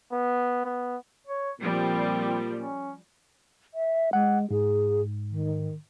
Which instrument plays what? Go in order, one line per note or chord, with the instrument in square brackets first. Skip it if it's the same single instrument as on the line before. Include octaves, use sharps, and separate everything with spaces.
[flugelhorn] B3
B3
[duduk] C#5
[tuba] A#2 [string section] F3 G3 [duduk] C4
[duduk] C#4
[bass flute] E5
[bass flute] G#3 [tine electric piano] F#5
[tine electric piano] G#2 [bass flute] G#4
[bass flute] D#3